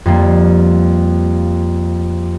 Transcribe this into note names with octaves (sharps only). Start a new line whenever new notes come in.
F2 G3 A#3